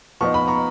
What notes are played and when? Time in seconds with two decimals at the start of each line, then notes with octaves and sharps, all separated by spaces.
0.21 F3 B3 D#4 C#6
0.34 B5
0.47 A#5 C#6